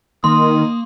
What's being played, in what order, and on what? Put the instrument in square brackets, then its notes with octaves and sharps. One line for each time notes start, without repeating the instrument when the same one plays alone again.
[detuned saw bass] D#3 [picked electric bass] A#3 [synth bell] C6 [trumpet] D#6